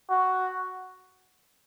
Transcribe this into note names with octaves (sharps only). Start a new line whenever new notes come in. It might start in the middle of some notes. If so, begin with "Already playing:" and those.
F#4